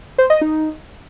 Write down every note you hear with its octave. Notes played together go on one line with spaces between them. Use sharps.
C5
D#5
D#4